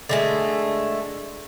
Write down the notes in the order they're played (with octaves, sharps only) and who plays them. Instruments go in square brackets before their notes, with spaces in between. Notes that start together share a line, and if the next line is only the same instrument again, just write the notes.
[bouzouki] D3 G#3 A3